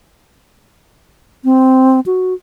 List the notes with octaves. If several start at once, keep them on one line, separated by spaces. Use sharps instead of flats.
C4
F#4